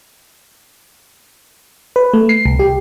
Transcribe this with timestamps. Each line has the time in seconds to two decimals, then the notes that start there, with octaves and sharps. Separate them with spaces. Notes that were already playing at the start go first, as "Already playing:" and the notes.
1.96 B4
2.13 A3
2.29 C7
2.45 C2
2.59 G4